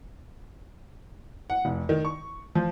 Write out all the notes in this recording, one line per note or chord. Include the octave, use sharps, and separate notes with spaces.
F#5
F1
D#3
C#6
F3